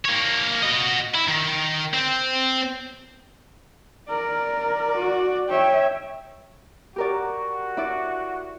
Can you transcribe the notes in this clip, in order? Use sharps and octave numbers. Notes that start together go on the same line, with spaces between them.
A#3 C#5
F#4 D#5
E4
D#3
C4
A#4 D5
F#4
C#5 E5 G5
F#4 G4 A#4 D5
E4 D5